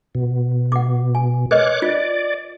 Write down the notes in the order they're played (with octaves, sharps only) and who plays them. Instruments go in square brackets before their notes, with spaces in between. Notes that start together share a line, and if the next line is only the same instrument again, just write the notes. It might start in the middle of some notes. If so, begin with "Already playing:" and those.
[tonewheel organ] B2
[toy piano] F#5 D6
G#5
[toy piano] A#4 B4 D#5 [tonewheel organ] C#5 D6 F#6
[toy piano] F4 [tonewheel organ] D5